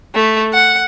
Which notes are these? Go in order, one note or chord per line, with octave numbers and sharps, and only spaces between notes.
A3
F#5